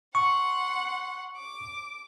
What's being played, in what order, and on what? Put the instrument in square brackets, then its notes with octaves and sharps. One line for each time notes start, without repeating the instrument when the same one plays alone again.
[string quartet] F#5 C6 [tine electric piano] C#6
[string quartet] D6